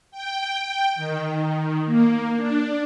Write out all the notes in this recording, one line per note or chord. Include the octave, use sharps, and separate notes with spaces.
G5
D#3
A#3
D4